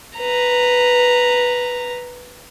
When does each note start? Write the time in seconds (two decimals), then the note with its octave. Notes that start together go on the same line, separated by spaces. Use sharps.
0.18 B4 A#5